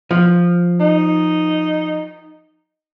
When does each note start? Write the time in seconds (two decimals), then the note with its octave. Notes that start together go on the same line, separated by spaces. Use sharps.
0.11 F3
0.80 D#4